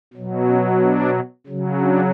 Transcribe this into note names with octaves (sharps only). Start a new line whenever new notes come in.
B2 F#3
C#4
D4
C#3 F#3
D4